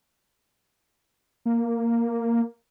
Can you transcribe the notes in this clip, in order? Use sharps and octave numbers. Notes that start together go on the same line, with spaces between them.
A#3